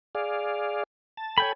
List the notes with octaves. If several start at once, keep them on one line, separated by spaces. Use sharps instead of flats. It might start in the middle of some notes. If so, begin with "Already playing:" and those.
G#4 D5 F5
A5
A4 C#5 G5 G#5 B5